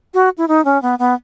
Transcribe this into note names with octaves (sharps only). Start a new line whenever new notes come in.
F#4
E4
D#4
C#4
B3
B3